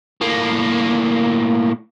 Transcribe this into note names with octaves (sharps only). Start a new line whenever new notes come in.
A2 A#3